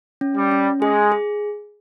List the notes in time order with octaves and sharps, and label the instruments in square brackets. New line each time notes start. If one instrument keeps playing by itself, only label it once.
[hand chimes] C#4
[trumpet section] G3
[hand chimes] C#4
[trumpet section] G#3 [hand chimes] G#4
[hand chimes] G#4